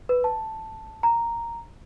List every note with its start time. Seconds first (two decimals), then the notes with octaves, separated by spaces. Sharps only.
0.09 B4
0.24 A5
1.03 A#5